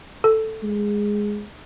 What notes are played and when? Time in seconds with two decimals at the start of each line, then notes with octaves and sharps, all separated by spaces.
0.24 A4
0.63 G#3